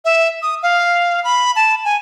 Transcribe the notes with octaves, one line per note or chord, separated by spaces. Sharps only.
E5
D#6
F5
B5
A5
G#5